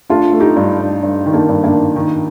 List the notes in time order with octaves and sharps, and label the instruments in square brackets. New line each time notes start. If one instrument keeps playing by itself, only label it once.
[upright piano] A3 [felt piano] D4 F4
[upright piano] A3
[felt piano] D#4 G4
[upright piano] G2
G2
G2
D#3
[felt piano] A#3 D4
[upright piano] G2
[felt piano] A#3 D4
[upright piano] D#3
D#3